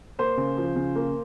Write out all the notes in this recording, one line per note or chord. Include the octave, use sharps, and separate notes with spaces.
A#3 C5
C#3
F3
C#3
A#3